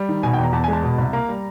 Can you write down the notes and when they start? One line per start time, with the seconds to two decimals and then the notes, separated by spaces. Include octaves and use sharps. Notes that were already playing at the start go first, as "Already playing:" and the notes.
Already playing: G3
0.09 D#3
0.23 B2 G#5
0.33 G5
0.38 E2
0.43 A#5
0.53 E2 A5
0.64 G#5
0.68 G#3
0.73 A5
0.83 B2
0.98 C2
1.13 A#3 A#5
1.29 G3